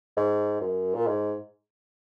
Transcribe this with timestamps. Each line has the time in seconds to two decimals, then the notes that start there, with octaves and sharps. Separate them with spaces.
0.17 G#2
0.61 F#2
0.95 A#2
1.07 G#2